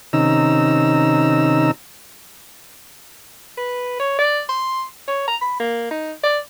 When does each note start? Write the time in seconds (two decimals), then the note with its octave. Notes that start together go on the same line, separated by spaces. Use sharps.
0.13 C3 D#3 C#4 D#4 A#5 E6
3.57 B4
3.99 C#5
4.18 D5
4.49 C6
5.07 C#5
5.27 A#5
5.41 B5
5.60 A#3
5.91 D#4
6.23 D5